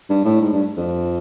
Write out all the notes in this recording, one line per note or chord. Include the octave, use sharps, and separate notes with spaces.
G2
A2
G#2
G2
F2